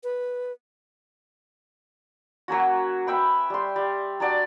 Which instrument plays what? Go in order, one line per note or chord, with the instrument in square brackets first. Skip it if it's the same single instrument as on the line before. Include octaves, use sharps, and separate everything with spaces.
[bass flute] B4
[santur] F#3 A#3 C#4 F#4
B4 E5 G5 B5
G3 C6
G3
F#3 D4 D5